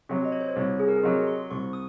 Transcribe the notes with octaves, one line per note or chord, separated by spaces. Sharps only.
C3 F#3
D#5
C#5
C5
C#5
C2 F#4
G#4
A#4
G#4
C3 F#3 D#5
C6
C2 C#6
D#6